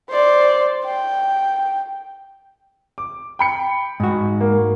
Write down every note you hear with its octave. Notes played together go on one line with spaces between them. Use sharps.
C5 D5
G5
D6
G5 B5 C#7
G#2 F#4
A#3